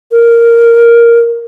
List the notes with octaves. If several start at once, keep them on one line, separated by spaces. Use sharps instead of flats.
A#4